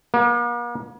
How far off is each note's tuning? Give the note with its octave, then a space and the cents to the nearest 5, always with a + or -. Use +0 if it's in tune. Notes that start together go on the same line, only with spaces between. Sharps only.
A#3 +45